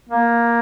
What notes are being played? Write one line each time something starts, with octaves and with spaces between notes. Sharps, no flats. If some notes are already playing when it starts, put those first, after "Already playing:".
A#3